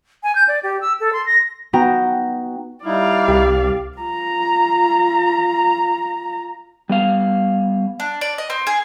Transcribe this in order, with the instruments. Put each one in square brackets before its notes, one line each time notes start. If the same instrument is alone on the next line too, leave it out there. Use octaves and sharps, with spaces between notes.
[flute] G#5
G6
D5
G4
E6
A4
C6
A#6
[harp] B3 D#4 F#4 G5 A#5
[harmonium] G3 D#4 E4 [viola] D5 F5
[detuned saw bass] C2 [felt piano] G4
[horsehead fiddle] F4 A#5
[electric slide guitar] G3 B3 F5
[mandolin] D4
D5
D#5
C4
G#4